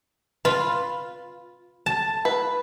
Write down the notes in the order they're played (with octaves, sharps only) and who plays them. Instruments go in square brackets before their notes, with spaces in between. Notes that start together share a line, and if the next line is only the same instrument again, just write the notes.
[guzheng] F4 [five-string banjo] B4
[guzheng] A5
[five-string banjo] B4